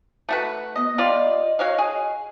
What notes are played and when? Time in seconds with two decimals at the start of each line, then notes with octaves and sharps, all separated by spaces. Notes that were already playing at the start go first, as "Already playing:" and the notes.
0.29 A3 F#4 B4
0.76 B3 D#5
0.98 G3 F4 D5 D#5
1.59 F#4 C#5 F5
1.78 G#4